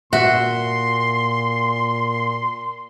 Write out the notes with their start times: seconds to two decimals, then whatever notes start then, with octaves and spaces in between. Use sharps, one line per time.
0.13 A#2 F#4 E5 C6